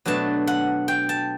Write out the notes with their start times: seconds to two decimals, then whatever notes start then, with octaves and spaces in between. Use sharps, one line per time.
0.05 B2 F#3 A3 D4 A5
0.47 F#5
0.88 G5
1.09 A5